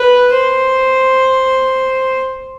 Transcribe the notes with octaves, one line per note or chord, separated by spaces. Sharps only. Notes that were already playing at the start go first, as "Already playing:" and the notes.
Already playing: B4
C5